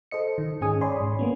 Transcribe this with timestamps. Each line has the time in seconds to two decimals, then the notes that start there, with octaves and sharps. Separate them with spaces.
0.11 A4 C5 D#5 C#7
0.38 D#3
0.61 G#2 C#4 G#4 G#5 D#6
0.81 C#5 D5 G#5 B5 C6
1.01 G#2
1.19 A#3 B3 C#4